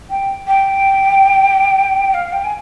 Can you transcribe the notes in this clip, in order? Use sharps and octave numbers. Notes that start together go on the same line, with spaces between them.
G5
G5
F5
G5
G#5